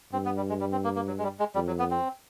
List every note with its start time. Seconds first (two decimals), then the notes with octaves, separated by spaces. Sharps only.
0.13 G2 C4
0.25 B3
0.37 G3
0.49 G#3
0.60 G3
0.72 C4
0.84 A#3
0.96 A#3
1.07 F#3
1.18 G#3
1.23 G3
1.39 G#3
1.55 F2 G3
1.67 F#3
1.79 B3
1.91 C4